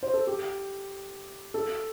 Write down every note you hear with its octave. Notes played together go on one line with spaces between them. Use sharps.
C5
A4
G4
A4